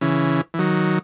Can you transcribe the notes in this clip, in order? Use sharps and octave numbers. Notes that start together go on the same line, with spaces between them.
C#3 E3
E3
D#3 F#3